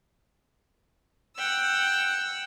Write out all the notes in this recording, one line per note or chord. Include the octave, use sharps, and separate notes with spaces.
F#5 G5 E6